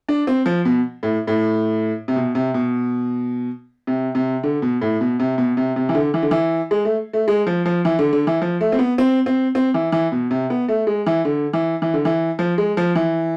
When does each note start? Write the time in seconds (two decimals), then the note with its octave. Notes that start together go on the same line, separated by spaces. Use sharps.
0.08 D4
0.27 C4
0.46 F3
0.65 B2
1.03 A2
1.27 A2
2.08 C3
2.16 B2
2.35 C3
2.54 B2
3.87 C3
4.15 C3
4.43 D3
4.62 B2
4.81 A2
5.01 B2
5.20 C3
5.38 B2
5.57 C3
5.76 C3
5.89 E3
5.95 D3
6.14 E3
6.23 D3
6.31 E3
6.71 G#3
6.85 A3
7.13 A3
7.28 G#3
7.47 F3
7.66 F3
7.85 E3
7.99 D3
8.13 D3
8.27 E3
8.42 F3
8.61 A3
8.72 C4
8.79 B3
8.98 C4
9.26 C4
9.55 C4
9.74 E3
9.92 E3
10.12 B2
10.31 C3
10.50 B3
10.68 A3
10.87 G#3
11.06 E3
11.25 D3
11.53 E3
11.82 E3
11.94 D3
12.05 E3
12.39 F3
12.58 G#3
12.77 F3
12.95 E3